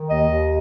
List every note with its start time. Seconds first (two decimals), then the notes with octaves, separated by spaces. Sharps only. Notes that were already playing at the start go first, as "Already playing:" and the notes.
Already playing: D#3
0.08 D#2 D#5
0.28 D#2